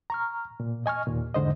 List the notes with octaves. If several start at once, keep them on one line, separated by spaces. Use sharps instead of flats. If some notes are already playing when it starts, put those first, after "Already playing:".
A#5 C#6 F6
A#2
D#5 G#5 C#6 F6
D#2 A#2
E2 G#2 D3 C5 D#5